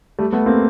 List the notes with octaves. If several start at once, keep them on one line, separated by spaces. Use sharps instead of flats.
G3 A3
A3 B3
A#3 C4